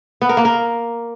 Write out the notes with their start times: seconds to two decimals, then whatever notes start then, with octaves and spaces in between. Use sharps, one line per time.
0.22 B3
0.29 A#4
0.37 A#3
0.45 A#4